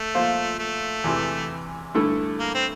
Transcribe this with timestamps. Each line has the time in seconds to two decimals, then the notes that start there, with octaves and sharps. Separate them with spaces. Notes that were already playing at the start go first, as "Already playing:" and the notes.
Already playing: A3
0.15 F3 A#3 F4 C5
0.59 A3
1.04 E2 C3 E3
1.94 G2 D3 A3 E4 A4
2.39 A#3
2.54 C4